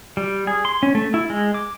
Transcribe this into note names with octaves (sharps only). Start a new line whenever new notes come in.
G3
G#4
C6
C#4
A3
E4
G#3
D6